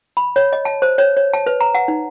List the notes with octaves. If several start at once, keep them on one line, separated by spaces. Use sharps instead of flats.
B5
C#5
D#5
A5
C5
C#5
C#5
A5
B4
A#5
F#5
D#4